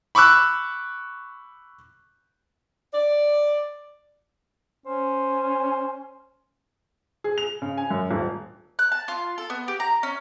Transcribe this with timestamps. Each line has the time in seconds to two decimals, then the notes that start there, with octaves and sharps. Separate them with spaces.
0.15 B5 C#6 D6 E6 F#6
2.94 D5
4.86 C#4 C5
7.24 G#4
7.38 F7
7.62 C#3
7.77 G#5
7.90 F#2
8.11 D#1
8.79 F#6
8.92 A5
9.08 F4
9.38 A4
9.50 B3
9.68 G4
9.80 A#5
10.03 C#4